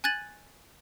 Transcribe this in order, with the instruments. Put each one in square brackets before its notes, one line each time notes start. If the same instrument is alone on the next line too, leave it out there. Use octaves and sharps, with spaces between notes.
[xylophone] G#5 F#6 G#6 A6 D#7 F#7